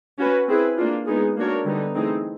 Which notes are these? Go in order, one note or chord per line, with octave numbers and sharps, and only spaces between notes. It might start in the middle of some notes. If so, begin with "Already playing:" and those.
C#4 F#4 B4
C4 E4 G#4 B4
A#3 D4 F4
G#3 B3 D#4 G#4
A#3 D4 F#4 A#4 C#5
D3 G3 B3 D#4
E3 A3 C4 D#4 G#4